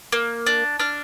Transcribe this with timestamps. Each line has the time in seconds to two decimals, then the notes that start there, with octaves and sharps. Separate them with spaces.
0.12 A#3
0.46 D4
0.80 D4 F6